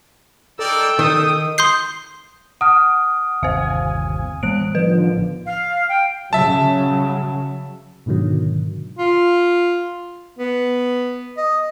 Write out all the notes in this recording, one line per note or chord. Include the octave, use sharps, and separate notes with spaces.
D#4 A4 A#4 D5 G5 E6
D#3 D#6
C6 D#6 G6 C7
F#5 D#6 F6
G1 D#2 C3 C5 F5 G#5
A1 E3 B3 F#6 D7
D3 D#3 F3 B4
F5
G5
C#3 F#3 E5 A5
G#2 B2 D3 D#3 F#3
F4
B3
D#5